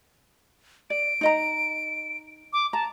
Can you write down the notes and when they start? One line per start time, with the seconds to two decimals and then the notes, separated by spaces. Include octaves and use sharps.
0.90 D5 D7
1.21 D#4 D#5 A#5
2.53 D6
2.73 A5 A#5